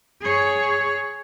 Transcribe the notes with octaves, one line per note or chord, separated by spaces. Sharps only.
G#4 C#5